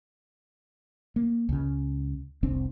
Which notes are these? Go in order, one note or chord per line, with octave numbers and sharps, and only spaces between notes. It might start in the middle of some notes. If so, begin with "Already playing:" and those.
A#3
C#2 C#3
F1 C2 C4 D4